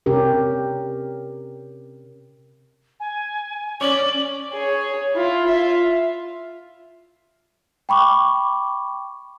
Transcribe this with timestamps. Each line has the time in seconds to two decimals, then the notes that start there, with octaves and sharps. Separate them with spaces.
0.06 C3 C#4 G4 A#4
3.00 G#5
3.81 C#4 C#5 D5 F#7
4.53 G#4 C#5
5.14 E4 F4
5.48 F4 E5
7.89 G5 B5 C#6 D6